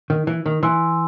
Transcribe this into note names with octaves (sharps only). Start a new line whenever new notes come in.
D#3
E3
D#3
E3 G#5 C6 E6